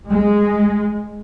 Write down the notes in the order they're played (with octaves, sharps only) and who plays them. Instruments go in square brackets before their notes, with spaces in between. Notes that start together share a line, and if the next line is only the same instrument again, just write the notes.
[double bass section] G#3